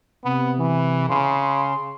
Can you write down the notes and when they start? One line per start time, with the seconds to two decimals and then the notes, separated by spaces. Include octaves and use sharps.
0.24 C3 B3
0.58 E3
1.09 C#3 C6